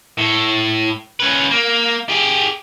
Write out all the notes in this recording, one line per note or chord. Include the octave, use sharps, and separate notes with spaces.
A2
C#4 B4
A#3
G4 G#4